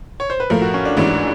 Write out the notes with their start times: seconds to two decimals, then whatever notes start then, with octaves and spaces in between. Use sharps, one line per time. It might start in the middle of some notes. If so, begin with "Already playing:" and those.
0.20 C#5
0.30 C5
0.40 B4
0.50 A2 F3 A3 A#4
0.62 F#4
0.74 C#4
0.85 D4
0.97 A1 G#2 E3 D4